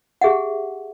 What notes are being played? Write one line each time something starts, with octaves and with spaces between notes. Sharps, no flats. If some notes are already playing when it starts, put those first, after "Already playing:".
G4 G#4 E5 F#5